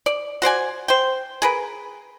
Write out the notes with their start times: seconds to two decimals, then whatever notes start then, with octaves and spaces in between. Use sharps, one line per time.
0.06 D5
0.42 F#4 C5 D5 G#5
0.88 C5 G5
1.42 G#4 A#4 B4